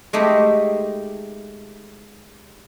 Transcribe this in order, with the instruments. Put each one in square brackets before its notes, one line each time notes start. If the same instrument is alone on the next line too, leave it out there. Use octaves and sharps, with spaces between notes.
[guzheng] G#3 A3 D#4 G4